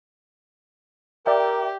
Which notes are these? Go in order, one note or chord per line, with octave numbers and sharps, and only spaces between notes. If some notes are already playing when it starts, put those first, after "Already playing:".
G4 A#4 D5 E5 G5